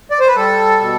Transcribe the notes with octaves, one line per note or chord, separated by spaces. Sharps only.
D5
C5
B4
G3 A4
B2